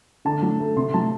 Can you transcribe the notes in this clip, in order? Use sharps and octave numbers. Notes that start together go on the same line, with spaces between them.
D3 A5
F#3
A3
C3 C6
F#3 A5